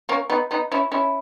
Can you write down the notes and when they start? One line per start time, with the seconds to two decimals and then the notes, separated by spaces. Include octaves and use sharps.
0.09 A#3 C#4
0.30 B3 D#4
0.51 B3 D#4
0.72 C#4 E4
0.92 C#4 E4